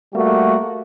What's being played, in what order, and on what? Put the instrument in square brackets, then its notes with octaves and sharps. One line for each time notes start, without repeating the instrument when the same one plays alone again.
[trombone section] G3 A3 A#3 F#4